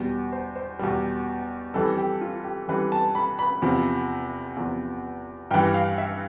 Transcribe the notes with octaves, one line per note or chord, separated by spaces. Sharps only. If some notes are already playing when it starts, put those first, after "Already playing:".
Already playing: E2 B2 G3
C5
C5
E2 B2 G3
F2 E3 G3 A4
G4
F4
G4
F2 E3 G3 B4
A5
B5
B5
E2 C3 F3
E2 C3 F3
G2 E3 G3 G5
F5
E5